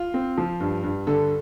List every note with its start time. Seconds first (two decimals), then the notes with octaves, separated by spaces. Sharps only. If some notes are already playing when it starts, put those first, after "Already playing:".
Already playing: F4
0.14 C4
0.37 F3
0.60 G2
0.83 G2
1.07 D3 A4